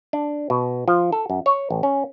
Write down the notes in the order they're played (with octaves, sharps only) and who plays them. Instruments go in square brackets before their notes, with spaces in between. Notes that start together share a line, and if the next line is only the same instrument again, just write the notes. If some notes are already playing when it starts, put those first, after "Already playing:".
[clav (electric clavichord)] D4
B2
F3
A4
F#2
C#5
A1
C#4